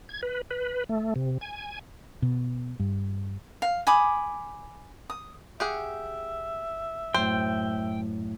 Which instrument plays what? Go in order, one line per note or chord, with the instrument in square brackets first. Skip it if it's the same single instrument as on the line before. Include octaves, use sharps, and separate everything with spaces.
[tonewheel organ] G#6
B4
B4
A3
C3
G#5
[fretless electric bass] B2
G2
[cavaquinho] F5
G#5 B5 D6 D#6
D#6
[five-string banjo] G4 G#4 F#5 [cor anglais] E5
[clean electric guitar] F#2 A2 [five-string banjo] C5 [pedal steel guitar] G5